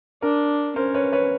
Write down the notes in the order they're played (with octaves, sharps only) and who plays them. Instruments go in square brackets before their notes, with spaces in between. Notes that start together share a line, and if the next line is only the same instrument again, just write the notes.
[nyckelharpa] D4 [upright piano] A#4
[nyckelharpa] C#4 [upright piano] A#4 C5
[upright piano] B4 C#5
B4 C#5